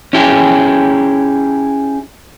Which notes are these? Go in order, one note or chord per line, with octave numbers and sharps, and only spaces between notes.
C#4 E4 G4 G#4